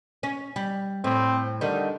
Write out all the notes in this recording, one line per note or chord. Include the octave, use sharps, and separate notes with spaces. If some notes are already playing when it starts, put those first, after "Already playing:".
C#4
G3
A2 C4
D3 D#3 G3